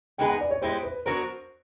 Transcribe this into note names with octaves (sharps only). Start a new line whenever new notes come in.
G#3 B3 D#4 G#4 B4 G5
F#5
D5
C#5
G#3 B3 E4 G4 C5
B4
F#3 B3 D4 F#4 A#4 C5